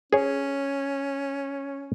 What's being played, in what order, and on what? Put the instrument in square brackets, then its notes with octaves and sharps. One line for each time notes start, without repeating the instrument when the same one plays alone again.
[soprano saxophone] C#4 [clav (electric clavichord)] G#4 C#5